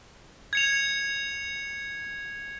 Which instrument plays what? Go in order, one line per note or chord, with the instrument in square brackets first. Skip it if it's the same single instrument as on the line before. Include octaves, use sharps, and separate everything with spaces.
[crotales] G#6 C#7 F7